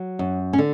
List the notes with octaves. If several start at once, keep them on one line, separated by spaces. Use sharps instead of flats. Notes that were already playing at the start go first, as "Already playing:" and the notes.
Already playing: F#3
F#2
C#4
D3